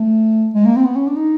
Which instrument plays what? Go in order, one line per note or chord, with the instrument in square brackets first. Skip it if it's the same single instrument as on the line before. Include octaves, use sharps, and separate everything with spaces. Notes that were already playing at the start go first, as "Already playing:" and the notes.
Already playing: [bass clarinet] A3
G#3
A#3
C4
B3
C#4
D4
D#4